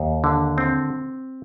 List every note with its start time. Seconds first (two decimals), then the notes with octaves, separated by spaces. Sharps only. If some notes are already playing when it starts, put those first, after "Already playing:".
Already playing: D#2
0.24 D3
0.58 C4